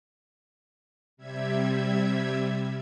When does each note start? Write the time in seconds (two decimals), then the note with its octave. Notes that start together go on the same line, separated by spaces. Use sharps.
1.17 C3 G3 E5 G#6